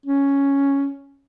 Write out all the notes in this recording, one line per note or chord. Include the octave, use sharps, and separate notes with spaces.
C#4